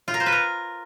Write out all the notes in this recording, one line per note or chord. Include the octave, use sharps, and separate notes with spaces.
F4
A#4
C5
B4
A#4